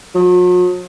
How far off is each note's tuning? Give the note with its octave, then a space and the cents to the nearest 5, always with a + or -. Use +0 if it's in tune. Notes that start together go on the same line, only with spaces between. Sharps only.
F#3 -45